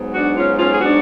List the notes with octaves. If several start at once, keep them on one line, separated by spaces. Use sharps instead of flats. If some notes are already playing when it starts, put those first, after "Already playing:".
Already playing: G#2 F#3 B3
D4 F#4
C#4 F4
C#4 F4
G#4
D4 F#4